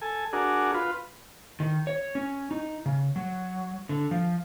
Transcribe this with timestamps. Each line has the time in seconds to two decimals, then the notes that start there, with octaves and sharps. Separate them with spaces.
0.02 A4 G#5
0.33 D4 F#4 G#4 A#4
0.74 F4 B4
1.60 D#3
1.87 C#5
2.15 C#4
2.51 D#4
2.86 C#3
3.16 F#3
3.89 D3
4.11 F3